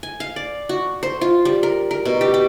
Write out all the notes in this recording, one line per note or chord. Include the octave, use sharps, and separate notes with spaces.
G#5
F5
D5
F#4
C5
F4
G3
A#4
A#4
B2
G4
G4